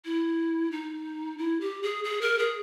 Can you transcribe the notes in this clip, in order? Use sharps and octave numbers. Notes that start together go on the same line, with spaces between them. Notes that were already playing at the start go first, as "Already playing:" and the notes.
E4
D#4
E4
G4
G#4
G#4
A#4
G#4